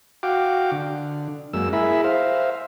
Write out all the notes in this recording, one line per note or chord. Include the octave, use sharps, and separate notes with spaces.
F#4 F5 G5 D6
D3
F#2 G#3 A#3 E6
E4 G#4 A#4 E5 B5
C5 E5 F5